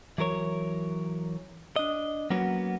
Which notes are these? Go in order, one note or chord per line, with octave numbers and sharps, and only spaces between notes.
E3 F#3 A#4 C#5
D4 D#5
F#3 A#3 B3 C#4 F#4